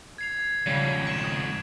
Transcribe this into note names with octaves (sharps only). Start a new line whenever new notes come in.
G#6 C7 F7
F2 G#2 C#3 G3
C#6 D7 E7
D#6